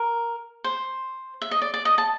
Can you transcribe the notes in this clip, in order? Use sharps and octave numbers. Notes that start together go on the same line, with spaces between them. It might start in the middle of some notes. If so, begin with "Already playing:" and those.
Already playing: A#4
C5
E5
D#5
D5
D5
D#5
A5